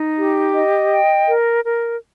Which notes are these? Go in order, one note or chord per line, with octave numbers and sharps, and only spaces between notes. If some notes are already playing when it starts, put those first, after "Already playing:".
Already playing: D#4
G4
D#5
G5
A#4
A#4